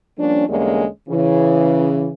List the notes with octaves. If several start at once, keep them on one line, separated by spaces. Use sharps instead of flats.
F3 G3 A#3 C#4 D4
E2 D3 G3 G#3 A#3 C#4
C#3 E3